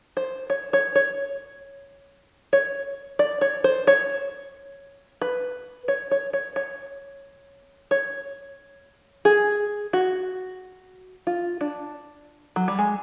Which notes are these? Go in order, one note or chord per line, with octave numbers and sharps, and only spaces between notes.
C5
C#5
C#5
C#5
C#5
D5
C#5
C5
C#5
B4
C#5
C#5
C#5
C#5
C#5
G#4
F#4
F4
D4
F#3
G3
G#3